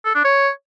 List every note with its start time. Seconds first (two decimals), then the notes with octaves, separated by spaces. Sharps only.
0.05 A4
0.15 D4
0.24 C#5